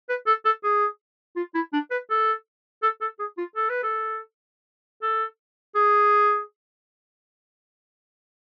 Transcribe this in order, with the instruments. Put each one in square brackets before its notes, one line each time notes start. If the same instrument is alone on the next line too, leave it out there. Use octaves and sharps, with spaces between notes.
[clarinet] B4
A4
A4
G#4
F4
E4
D4
B4
A4
A4
A4
G#4
F4
A4
B4
A4
A4
G#4